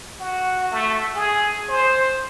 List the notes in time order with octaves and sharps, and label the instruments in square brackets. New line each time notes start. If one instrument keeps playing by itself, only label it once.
[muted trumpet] F#4
A3
G#4
C5